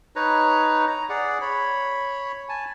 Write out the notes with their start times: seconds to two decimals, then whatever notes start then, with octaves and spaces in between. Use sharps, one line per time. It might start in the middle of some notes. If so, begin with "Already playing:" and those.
0.16 D#4 B4 C#5 A#5
0.87 A#5
1.09 G#4 D5 F#5
1.41 C#5 B5
2.49 G#5 A5